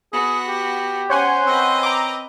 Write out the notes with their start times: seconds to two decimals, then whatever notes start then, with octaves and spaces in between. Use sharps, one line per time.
0.13 B3 F#4 G#4
0.48 G4
1.10 C#4 C5 C#5 F#5 G#5
1.47 C4 B4 D#5
1.83 A#5 D6